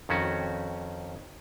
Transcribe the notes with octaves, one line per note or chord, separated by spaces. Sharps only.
F2 D#3 C#4 F#4